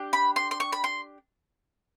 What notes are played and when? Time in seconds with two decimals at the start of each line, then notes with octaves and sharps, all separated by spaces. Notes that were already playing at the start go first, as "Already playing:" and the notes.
Already playing: D4 G4
0.13 B5
0.36 C6
0.51 C6
0.60 C#6
0.72 B5
0.84 C6